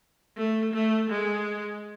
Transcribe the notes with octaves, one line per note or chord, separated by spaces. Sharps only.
A3
A3
G#3